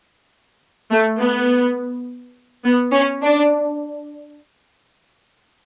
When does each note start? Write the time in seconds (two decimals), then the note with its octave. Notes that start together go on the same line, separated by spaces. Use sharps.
0.91 A3
1.19 B3
2.65 B3
2.93 C#4
3.22 D4